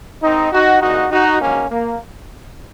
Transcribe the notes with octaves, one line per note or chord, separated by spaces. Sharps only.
G#1 G#2 D#3 C4 D#4
D#4 F#4
C2 A#2 G#3 D#4 F#4
D#4 F#4
A#1 G#2 D#3 F#3 A#3 C#4
A#3